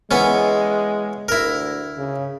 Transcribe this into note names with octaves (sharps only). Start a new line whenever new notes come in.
E3 G#3 B3 C#4
D2 E4 A#4
C#3